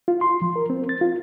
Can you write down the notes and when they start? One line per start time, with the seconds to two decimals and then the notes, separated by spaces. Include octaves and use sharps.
0.08 F4
0.21 C6
0.42 F3
0.56 A#4
0.70 C4
0.89 A6
1.01 F4